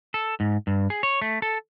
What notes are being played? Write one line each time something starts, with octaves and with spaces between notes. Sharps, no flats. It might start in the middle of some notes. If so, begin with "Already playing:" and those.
A4
G#2
G2
G#4
C#5
A3
A4